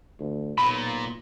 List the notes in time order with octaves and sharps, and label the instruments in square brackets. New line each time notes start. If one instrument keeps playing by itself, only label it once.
[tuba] D2
[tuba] B1 [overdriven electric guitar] A#2 [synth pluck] B5